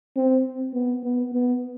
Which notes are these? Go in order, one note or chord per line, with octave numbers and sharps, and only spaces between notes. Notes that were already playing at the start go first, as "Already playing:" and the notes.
C4
B3
B3
B3